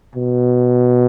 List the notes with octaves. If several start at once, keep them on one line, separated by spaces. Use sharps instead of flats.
B2